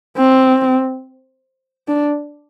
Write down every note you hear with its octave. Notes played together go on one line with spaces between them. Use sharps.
C4
D4